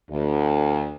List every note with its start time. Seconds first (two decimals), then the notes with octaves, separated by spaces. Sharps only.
0.11 D2